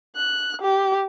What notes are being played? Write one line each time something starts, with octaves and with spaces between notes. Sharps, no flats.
F#6
G4